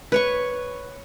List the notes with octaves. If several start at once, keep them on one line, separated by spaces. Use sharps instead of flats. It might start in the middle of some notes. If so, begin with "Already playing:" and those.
B4 C#5 C#6